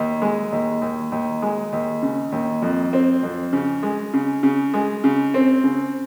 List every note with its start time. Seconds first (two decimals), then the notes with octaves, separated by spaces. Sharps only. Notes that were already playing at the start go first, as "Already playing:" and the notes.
Already playing: D#2
0.22 G#3
0.52 D#2
0.82 D#2
1.12 D#2
1.42 G#3
1.72 D#2
2.02 C#3
2.32 D#2
2.62 F2
2.93 C4
3.23 F2
3.53 C#3
3.83 G#3
4.14 C#3
4.43 C#3
4.74 G#3
5.04 C#3
5.34 C4
5.64 C#3